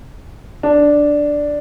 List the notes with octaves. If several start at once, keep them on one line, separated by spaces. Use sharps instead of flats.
D4